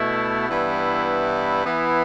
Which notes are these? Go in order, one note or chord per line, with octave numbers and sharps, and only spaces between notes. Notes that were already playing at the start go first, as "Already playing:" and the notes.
Already playing: B2 A3 E4
G2 E3 B3 E4
E3 B3 E4